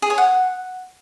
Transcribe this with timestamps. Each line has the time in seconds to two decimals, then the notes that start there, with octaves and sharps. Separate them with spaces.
0.02 G#4
0.10 C#5
0.18 F#5